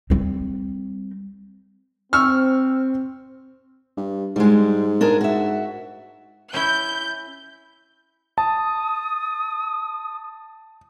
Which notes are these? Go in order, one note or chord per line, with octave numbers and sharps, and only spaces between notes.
G3 C4
C4 C#6 E6 F6
G2
G#2 G3 G#3
D4 G#4 A#4
F#4 E5
C#4 E4 G6
A5 D#6